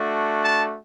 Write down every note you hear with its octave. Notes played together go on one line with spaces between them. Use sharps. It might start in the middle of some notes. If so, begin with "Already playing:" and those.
Already playing: A3 D4 F#4
A5